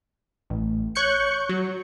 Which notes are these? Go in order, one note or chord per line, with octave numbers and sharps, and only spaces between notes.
A1
C#5 C#6 F#6 G6 C#7
F#3